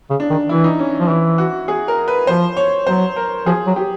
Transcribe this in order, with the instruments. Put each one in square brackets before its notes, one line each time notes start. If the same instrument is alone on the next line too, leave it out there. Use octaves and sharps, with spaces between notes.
[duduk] C#3
[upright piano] D4
[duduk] D#3
[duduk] E3 [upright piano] E4
[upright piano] D#4
C#4
[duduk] F3
[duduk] E3 [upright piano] E4
[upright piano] F#4
G#4
A#4
B4
[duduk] F3 [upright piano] C5
[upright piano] C#5
[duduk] F#3 [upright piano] C5
[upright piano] A#4
[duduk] F3 [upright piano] G#4
[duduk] F#3
[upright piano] G4